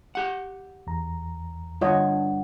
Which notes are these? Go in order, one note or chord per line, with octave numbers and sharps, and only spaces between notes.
G4 F#5
E2 A#5
G2 D3 F4 C#5 D#5 F#5